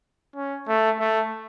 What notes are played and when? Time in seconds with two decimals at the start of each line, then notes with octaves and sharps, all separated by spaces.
0.36 C#4
0.68 A3
1.00 A3